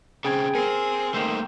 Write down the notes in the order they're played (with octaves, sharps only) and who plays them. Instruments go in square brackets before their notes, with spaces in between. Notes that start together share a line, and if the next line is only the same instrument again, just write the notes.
[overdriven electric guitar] C#3 C4 [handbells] G#4 G5 G#6
[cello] C4 [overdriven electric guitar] G#4 [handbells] A#4
[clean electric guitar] D#3 C5 [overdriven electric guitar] A3 A#3